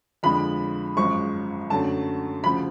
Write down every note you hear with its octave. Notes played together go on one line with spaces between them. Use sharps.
F2 D3 F3 G#3 B5
G#1 F#2 F3 G#3 C#6
F#2 D3 F#3 A3 A5
D2 C#3 F3 B5